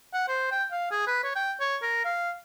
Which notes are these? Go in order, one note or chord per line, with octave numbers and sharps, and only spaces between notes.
F#5
C5
G5
F5
G#4
B4
C#5
G5
C#5
A#4
F5